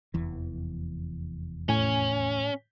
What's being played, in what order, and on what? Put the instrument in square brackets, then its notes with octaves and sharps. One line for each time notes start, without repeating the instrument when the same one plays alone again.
[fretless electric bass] F1 E2 E3
[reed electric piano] A2 G#5 [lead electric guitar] C#4